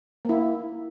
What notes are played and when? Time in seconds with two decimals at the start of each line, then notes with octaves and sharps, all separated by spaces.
0.25 A#3 E4